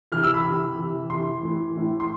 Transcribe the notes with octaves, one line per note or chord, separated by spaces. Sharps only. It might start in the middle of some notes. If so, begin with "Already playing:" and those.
C3 E3 F6
E6
B5
C3
E3
C3 E3
C3 E3 C6
A2 E3
A2 E3
C6